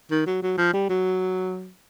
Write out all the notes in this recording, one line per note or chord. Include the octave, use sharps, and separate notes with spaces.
D#3
F#3
F#3
F3
G3
F#3